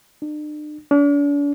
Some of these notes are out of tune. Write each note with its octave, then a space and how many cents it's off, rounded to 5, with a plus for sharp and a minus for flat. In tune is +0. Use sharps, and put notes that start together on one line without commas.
D4 +45
D4 -40